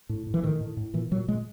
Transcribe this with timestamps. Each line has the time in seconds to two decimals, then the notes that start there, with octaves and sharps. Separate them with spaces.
0.09 A2
0.27 A2
0.34 E3
0.43 A2 D#3
0.61 A2
0.77 A2
0.94 A#2 E3
1.11 A#2 F#3
1.28 A#2 G#3